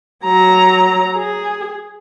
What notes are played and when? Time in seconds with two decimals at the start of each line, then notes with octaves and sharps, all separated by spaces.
0.25 F#3 A#5
1.16 G#4